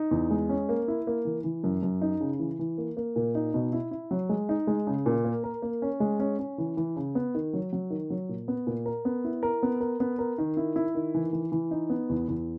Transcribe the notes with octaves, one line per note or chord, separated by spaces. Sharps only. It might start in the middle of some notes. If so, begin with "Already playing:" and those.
Already playing: D#4
E2
G#3
C#4
A#3
E4
A#3
E3
E3
F#2
F#2
D#4
C#3
E3
E3
A#3
A#3
A#2
D#4
B2
E4
E4
F#3
G#3
D#4
G#3
C#3
A#2
A#3
A#4
A#3
C#4
G#3
C#4
C#4
E3
E3
C#3
B3
D#3
F#3
F#3
D#3
F#3
A#2
B3
A#2
A#4
B3
E4
A#4
B3
A#4
B3
A#4
D#3
E4
E4
D#3
E3
E3
E3
D#4
B3
E2
E2